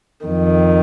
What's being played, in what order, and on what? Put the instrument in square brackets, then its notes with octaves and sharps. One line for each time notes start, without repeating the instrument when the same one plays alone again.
[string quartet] F2 D#3